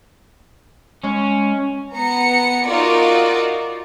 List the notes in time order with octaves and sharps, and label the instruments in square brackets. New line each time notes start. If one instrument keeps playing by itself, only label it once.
[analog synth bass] G#3 [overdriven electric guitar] C#4
[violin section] B3 A#5 C#7
D#4 F4 F#4 A#4 D5